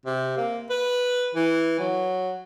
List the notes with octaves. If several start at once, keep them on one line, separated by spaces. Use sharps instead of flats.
C3
A#3
B4
E3
F#3